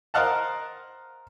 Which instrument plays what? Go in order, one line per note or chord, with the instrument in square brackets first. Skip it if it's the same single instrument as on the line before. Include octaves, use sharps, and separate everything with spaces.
[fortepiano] A#4 C5 D#5 F5 F#5 A5